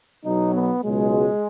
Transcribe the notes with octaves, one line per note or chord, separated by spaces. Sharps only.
B1 B2 F#3 D#4
B3
C#2 B2 F#3 G#3